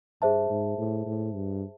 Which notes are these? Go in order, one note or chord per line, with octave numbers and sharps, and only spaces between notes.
G2 G#4 C5 E5 A5
G#2
A2
A2
G2